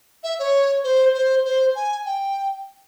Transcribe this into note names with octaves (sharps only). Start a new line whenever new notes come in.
E5
C#5
C5
C5
C5
G#5
G5